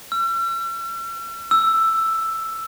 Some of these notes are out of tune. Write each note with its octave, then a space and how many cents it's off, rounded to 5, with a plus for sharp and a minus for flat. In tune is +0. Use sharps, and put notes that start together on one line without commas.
E6 +45
E6 +5